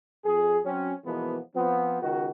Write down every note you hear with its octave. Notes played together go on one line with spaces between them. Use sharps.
F2 G#4
F#3 C4 C#4
B2 E3 F3 G#3 A#3 B3
F3 B3 C4
C#2 D#3 F#4